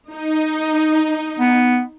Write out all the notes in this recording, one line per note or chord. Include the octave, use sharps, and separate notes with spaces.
D#4
B3